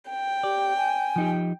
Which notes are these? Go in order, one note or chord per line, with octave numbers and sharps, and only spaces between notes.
G5
G4 D5
G#5
F3 D#4 G4